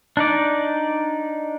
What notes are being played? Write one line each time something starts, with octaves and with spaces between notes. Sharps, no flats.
D4 D#4 D5